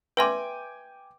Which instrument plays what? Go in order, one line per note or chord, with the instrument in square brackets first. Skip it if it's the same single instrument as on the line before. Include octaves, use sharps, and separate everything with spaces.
[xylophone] B4 E5 C6 [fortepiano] G5 G#5 D6